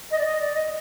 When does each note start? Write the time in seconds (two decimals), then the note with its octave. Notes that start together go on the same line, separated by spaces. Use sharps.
0.11 D#5
0.19 D5
0.26 D#5
0.40 D5
0.54 D#5